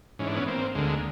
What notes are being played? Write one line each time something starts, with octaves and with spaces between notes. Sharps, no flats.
G#2 E3 C#4
D4
B3 C#4
A#3 C4
D2 D3 G#3 A#3